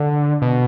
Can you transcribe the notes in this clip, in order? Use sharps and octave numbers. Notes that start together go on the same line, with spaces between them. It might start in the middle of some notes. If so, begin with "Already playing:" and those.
Already playing: D3
B2